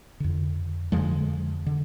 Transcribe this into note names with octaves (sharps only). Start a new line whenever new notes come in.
F2 D3
F2 D3 F3 G#3
D3